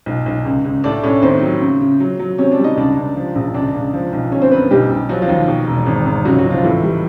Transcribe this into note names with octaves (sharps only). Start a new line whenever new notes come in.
B1
B1
C#2
C#2
A2 D4 D5
A2 C#4 C#5
D#2 C4 C5
F#3
C#3
C#3
F#3
F#3
C3 C#4 C#5
D4 D5
G3
D#4 D#5
C#2 D4 D5
C#2
F3
A#1
C#2 D4 D5
C#2
F3
B1
D3 C#4 C#5
C4 C5
F#2 B3 B4
B1 G3 G4
B1
F3 F#3 F#4
F3 F4
D#2
B2
E1
G#1
G#1
C#2 F#3 F#4
F#3 F#4
C#2
F3 F4
A2 E3 E4
G3